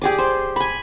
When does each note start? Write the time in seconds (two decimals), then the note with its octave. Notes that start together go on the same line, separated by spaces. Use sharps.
0.02 G4 G#4 D5
0.18 C5
0.56 G#5 B5